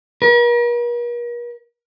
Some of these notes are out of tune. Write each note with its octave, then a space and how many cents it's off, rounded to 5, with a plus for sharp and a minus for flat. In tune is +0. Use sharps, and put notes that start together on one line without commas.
A#4 +45